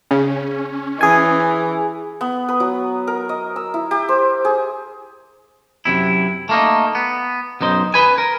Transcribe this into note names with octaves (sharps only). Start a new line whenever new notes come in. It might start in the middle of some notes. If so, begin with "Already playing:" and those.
C#3 C#4
E3 G#4 G#5
B3
B4
F#3
A#4
D#5
E6
E4
G4
C5
G#4
F#2 C3 E4
A3 A#3 D#4
B3
B1 F#2 D#4 C5
B4 G#5
A#4